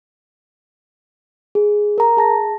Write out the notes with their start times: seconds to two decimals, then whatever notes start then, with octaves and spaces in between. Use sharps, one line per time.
1.55 G#4
1.98 A#4 A#5
2.17 G#4 A5 A#6